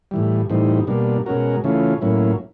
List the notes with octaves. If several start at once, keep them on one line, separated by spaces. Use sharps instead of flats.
A2 E3 G3
A2 E3 G3 C4 D#4
B2 G3 A#3 D4
B2 G#3 C#4 F#4 A#4
C#3 E3 A3 C#4 F4
A2 F#3 A#3 C#4 E4